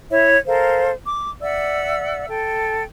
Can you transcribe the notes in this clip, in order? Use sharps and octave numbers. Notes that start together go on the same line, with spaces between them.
E4 C#5 E5
A4 A#4 C5 F5
D6
D5 E5 F#5 E6
A4 G5